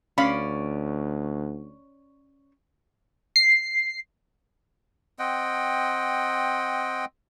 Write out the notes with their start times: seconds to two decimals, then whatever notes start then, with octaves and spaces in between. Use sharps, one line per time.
0.18 D2 C#4 D5 F5 B5
3.36 C7
5.19 C4 D#5 F#5 G5